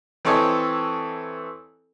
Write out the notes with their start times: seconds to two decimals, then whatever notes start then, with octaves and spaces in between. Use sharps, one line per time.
0.25 E3 C4 A4 C#5 D#5 G#5